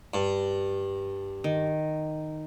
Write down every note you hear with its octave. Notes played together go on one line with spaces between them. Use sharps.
G2
D#3